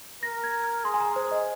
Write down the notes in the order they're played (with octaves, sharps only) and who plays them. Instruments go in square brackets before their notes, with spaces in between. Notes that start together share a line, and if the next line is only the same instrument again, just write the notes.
[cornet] A#4 [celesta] A#6
[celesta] G#6
F6
[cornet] G#4 [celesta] C6
[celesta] G#5
A#5
C5
D#5